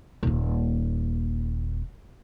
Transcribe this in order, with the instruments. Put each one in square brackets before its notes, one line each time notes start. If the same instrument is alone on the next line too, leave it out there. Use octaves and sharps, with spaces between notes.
[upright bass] D#1 A#3